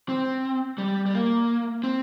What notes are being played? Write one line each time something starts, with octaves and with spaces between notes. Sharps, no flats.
C4
G3
G3
A#3
C4